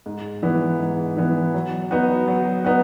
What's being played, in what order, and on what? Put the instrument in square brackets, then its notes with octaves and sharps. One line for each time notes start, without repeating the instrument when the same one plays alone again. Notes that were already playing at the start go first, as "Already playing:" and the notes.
[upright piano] G#2
E3 B3
G#2
E3 B3
F#3
B3 D#4 F#4
F#3
B3 D#4 F#4